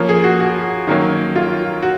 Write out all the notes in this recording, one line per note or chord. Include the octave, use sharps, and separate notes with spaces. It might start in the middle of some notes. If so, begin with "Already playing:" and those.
Already playing: F3 A#3 C#4
G#4
F#4
F#4
D#3 F#3 A#3 C#4
F4
F#4